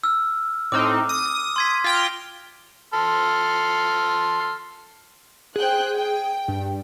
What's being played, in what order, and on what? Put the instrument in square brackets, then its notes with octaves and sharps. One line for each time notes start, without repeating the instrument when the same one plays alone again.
[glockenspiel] E6 F6
[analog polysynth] A2 C4 D#4 [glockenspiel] D6 F6
[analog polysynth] D#6
[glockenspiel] C6 G#6 B6
[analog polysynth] F4 G5 A#6
[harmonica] A4 C6 F6
[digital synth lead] G#4 [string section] C5 G5 F#6
[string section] G5
[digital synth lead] G2